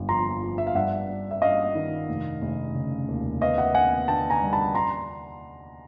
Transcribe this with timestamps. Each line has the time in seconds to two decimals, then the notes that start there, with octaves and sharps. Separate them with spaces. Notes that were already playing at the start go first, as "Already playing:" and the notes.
Already playing: G1 F2
0.09 F3 A#5 C6
0.42 F3
0.58 E5
0.67 F5
0.75 G2 E5 F#5
1.09 G2
1.31 E5
1.42 G2 D#5 F5
1.75 D#3
2.09 F1
2.42 F1
2.75 C#3
3.08 D#2
3.41 B3 D#5 F5
3.58 E5 F#5
3.75 B3 F#5 G#5
4.08 D3 G5 A5
4.30 G#5 A#5
4.42 G3
4.53 A5 B5
4.75 A#5 C6